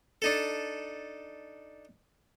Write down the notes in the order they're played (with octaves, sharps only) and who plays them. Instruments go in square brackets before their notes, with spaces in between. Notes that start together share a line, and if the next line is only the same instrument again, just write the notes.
[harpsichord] D4 D#4 A4